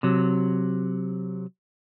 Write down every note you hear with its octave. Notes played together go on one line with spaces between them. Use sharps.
C3 F#3